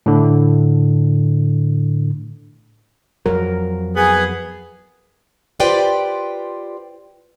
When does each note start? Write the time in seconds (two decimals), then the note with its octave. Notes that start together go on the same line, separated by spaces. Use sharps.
0.06 A2 D3
3.26 F2 F#3 A#4
3.96 B3 G#4
5.60 F4 G4 B4 C5 D5 G5